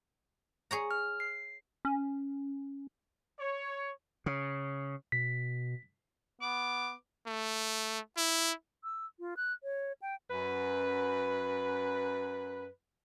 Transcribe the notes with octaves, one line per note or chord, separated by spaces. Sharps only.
G#4 C#5 A#5
F6
C7
C#4
C#5
C#3
B2 B6
B3 D6
A3
E4
E6
F4
F#6
C#5
G5
F#2 B4